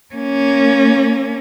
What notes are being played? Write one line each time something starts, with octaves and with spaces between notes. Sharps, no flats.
A#3 C#4